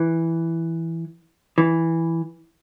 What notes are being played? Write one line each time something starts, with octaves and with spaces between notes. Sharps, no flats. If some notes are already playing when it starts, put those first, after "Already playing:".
Already playing: E3
E3